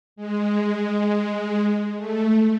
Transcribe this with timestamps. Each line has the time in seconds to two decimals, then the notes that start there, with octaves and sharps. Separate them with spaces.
0.16 G#3
1.96 A3